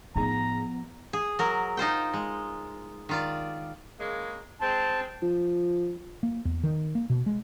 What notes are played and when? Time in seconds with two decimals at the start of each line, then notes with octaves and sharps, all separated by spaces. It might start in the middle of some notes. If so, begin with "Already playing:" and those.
0.16 A2 F3 B3 D#4 G#4 A#5
1.13 G#4
1.39 F#3 A#4
1.77 D#4 F4 C5 G5
2.14 G#3
3.09 D#3 F4 D5
3.99 C#3 G#3 A#3
4.61 G#3 C4 A5
5.22 F3
6.23 A#3
6.45 E2
6.64 D#3
6.95 A#3
7.10 B2
7.26 G#3